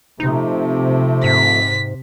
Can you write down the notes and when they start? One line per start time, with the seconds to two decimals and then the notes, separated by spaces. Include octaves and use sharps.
0.20 C3 F3 A3 D#4
1.24 G#2 B6